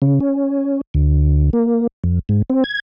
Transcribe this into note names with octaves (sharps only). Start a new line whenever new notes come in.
C#3
C#4
D2
A#3
F2
G#2
C4
G#6